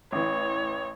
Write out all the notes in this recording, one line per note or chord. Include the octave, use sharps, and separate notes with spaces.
A1 E3 C#5